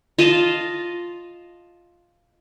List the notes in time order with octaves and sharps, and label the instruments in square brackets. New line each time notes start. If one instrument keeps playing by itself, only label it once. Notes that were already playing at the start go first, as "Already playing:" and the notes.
[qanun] F4 D#5 F5 A5